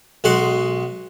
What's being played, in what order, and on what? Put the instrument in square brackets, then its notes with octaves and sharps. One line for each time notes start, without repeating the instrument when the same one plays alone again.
[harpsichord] B1 G#3 F#4 C6